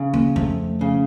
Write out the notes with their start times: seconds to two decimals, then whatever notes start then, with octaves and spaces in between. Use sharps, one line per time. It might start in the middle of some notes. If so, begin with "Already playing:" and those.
Already playing: C#3
0.14 A#3
0.36 F2 A3
0.81 C#3